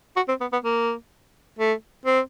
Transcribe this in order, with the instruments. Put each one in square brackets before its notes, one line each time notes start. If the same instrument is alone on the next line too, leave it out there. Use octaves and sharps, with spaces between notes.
[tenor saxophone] F#4
C4
B3
B3
A#3
A3
C4